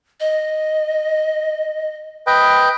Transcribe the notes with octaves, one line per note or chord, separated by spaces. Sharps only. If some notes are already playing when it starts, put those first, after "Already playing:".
D#5
B4 D#5 G5